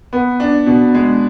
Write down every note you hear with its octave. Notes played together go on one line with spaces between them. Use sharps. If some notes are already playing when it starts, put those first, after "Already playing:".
B3
D4
B2
G#3